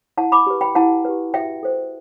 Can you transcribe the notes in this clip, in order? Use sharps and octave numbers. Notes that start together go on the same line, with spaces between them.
E4 F#5 A5
B5 D6
G4 B4
G5 B5
E4 F#5 A5
G4 B4
F#4 E5 G5
A4 C5